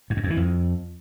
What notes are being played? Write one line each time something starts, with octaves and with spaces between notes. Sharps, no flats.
G#2
F#2
F2
E3
F2